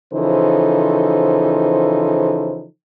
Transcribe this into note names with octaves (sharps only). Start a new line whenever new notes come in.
C#3 E3 F3 D#4 A4 C5